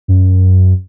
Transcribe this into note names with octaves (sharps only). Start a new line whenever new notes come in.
F#2